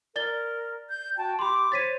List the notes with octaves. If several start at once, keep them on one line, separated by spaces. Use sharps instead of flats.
A#4 D5 A6 G7
G6
F#4 G5 A5
G4 B5 C6 D6
C5 C#5 A6 B6 D#7